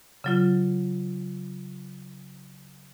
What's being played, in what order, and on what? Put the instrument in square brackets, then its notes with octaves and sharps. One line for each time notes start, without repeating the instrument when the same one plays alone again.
[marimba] C#3 F#3 F4